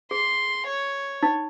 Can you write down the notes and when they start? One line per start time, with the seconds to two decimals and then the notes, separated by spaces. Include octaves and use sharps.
0.11 G#4 C6
0.67 C#5
1.23 D#4